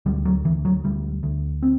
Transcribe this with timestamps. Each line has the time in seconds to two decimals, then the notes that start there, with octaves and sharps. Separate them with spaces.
0.06 D2 G3
0.25 F#3
0.45 D2 E3
0.65 F#3
0.84 D2 G3
1.23 D2
1.63 C4